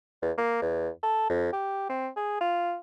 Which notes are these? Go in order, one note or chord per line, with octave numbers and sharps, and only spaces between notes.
E2
A#3
E2
A4
F2
G4
C4
G#4
F4